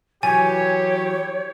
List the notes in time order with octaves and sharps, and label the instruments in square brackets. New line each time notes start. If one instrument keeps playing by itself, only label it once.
[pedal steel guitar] E3 F#3 [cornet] G4 [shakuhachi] C#5 [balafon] G#5